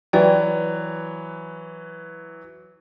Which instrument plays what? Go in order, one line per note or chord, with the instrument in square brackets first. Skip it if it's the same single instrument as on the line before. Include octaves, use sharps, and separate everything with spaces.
[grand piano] E3 F#3 [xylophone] B4 D5 G5